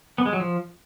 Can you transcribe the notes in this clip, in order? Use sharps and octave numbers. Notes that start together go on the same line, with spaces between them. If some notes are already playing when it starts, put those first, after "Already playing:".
B3
G#3
F#3
F3